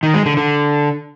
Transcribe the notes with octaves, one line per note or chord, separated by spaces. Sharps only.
D#3
G#3
D3
D3